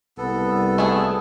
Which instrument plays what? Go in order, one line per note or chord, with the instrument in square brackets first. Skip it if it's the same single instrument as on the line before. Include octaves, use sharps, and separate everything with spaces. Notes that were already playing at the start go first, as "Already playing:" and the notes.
[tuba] C2 [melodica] B3 A4
[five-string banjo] A3 E4 G#4